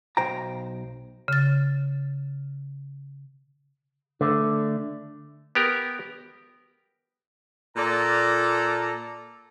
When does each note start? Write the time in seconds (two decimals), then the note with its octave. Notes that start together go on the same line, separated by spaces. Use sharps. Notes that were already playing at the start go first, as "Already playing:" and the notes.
0.17 B1 C5 G5 A#5
1.28 C#3 A6
4.21 D3 A3
5.55 B3 G4 A#4
7.77 A#2 A4 D5 A#5